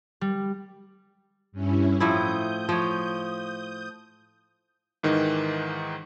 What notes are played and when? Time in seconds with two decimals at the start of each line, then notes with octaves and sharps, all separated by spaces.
0.21 G3
1.52 G2 C#4 E4
2.00 A2 F3 E4 D#6 G6
2.69 F3 C#5
5.03 G#2 D#3 E3 D#4